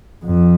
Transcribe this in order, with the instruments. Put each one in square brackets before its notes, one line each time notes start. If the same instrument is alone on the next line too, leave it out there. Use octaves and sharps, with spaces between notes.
[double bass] F2